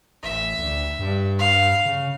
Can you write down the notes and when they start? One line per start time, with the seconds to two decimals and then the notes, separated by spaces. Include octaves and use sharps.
0.24 A1 E5
0.58 D2
0.99 G2
1.39 F5
1.85 C#3